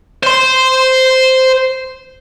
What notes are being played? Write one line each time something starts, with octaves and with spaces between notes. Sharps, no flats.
C5 C6